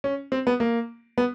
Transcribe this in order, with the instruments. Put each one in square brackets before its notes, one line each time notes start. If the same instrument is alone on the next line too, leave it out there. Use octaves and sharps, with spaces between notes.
[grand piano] C#4
C4
B3
A#3
B3